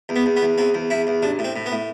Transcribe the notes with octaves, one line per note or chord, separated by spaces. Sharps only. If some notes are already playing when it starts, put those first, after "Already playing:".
E2
B3
E2
B3
E2
E2 C4
E2
E2 E4
E2
A1 D4
A2
C4
A2
B3
A2